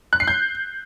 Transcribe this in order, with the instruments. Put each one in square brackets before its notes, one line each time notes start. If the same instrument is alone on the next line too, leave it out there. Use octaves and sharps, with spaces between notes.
[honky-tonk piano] F#6
C7
G6